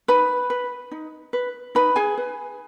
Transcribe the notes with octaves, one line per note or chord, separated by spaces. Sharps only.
D#4 B4 B5
B4
D#4
B4
D#4 B4 B5
G#4 G#5
B4